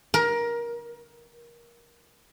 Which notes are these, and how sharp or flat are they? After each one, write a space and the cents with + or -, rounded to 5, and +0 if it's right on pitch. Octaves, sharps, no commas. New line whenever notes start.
A#4 +20